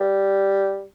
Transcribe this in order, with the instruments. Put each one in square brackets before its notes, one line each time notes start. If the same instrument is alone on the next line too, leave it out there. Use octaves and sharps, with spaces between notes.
[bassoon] G3